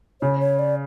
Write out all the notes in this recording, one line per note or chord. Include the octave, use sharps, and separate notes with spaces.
C#3 C#5
C#5
D5